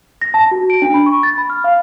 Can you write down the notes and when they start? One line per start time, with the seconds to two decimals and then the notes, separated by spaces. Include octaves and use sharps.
0.22 A#6
0.34 A5
0.51 F#4
0.70 D7
0.82 D4
0.94 B5
1.06 C#6
1.23 A6
1.38 B5
1.50 F6
1.64 F5